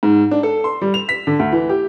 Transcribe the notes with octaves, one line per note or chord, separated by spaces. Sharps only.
G#2
D4
A4
C6
G3
F7
B6
D3
D2
E3
G4